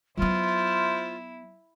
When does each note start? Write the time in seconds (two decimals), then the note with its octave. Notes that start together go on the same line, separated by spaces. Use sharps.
0.17 F#3 B3 E4 F4 C5